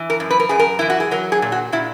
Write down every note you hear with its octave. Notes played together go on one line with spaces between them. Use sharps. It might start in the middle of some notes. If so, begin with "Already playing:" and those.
Already playing: E3
A#4
F#2
B4
A#4
F#2 G#4
A#4
E3 E4
F#4
G#4
F#3 A#4
G#4
A#2
F#4
A#2 E4